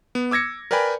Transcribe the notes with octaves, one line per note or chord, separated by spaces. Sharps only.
B3
D6 E6 G#6 A#6 C#7
A#4 B4 D5 G5 G#5 B5